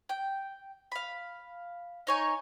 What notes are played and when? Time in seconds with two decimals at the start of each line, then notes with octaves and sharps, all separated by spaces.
0.09 G5
0.92 F5 B5
2.07 D#4 C#5 G#5